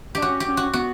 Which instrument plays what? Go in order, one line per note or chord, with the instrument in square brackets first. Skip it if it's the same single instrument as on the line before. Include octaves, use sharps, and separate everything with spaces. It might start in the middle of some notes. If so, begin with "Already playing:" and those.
[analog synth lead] D4 [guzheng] G4
[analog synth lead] C#4 [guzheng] F#4
[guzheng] G4
[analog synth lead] C#4
[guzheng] F#4
[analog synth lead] B3 [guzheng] F#4